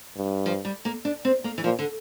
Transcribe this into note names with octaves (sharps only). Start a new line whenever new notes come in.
G2
F3
G3
A#3
D4
C4
A#3
E3
A#2 F3
D3